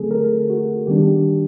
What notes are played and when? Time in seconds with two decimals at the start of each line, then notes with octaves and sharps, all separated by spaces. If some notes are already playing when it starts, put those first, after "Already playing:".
Already playing: D3 F#3 A3 C4 G#4 A4
0.11 A#4
0.50 F#4
0.87 D#3 G3 B3 D4 G4